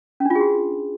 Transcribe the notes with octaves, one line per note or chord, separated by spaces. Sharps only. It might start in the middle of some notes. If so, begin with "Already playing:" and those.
C#4
D4
F4
G#4
F#4